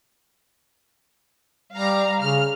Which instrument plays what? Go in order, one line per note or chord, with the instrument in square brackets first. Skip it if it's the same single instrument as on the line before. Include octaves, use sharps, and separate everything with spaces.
[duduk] G3 [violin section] F5 A#5
[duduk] C#3 [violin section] F6